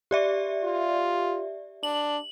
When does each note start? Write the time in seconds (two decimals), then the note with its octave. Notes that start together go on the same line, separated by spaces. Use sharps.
0.11 G4 D5 E5
0.63 F4
1.83 D4 F#7